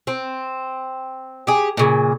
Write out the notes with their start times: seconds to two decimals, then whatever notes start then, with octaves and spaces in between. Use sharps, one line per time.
0.07 C4
1.47 G4 G#4
1.77 A#2 C#3